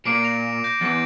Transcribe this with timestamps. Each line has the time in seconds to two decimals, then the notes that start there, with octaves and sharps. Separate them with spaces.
0.05 A#2 D6 C7 D7
0.23 A#6 F7
0.64 G6 A#6
0.81 E2 D6 A6